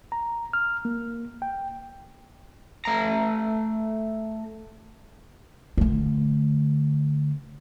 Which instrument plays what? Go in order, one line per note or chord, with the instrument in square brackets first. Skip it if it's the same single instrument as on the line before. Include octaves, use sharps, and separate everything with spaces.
[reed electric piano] A#5
F6
A#3
G5
[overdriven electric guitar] A3 A#5
[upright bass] D3 A3